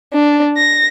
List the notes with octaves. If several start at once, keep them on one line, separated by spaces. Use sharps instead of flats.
D4
A#6